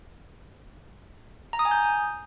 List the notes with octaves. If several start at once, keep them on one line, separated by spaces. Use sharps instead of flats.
A#5
D#6
G#5
G6